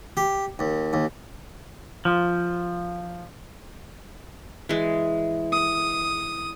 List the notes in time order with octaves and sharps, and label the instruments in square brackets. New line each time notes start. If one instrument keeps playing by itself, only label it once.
[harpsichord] G4
D#2
D#2
[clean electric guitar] F3
[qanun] E3 G#3
[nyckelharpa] D#6